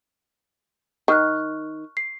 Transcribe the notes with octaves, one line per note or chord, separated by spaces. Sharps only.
D#3 C#6 F6 F#6
C7